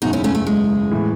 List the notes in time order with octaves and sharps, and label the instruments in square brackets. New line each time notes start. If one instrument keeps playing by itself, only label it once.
[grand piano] F#1 E2 B2 [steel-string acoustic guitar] D#4 F#4
[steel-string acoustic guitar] C#4 E4
A3 C#4
A3
G#3
[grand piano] A2 E3